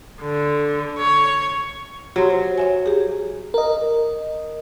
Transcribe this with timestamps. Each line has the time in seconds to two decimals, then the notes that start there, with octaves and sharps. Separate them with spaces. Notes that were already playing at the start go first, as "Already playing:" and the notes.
0.22 D3
0.99 C#5
2.16 F#3 G4 C6
2.31 C5
2.58 C#5 E5 G#5
2.86 G4 G#4
3.54 A#4 D#5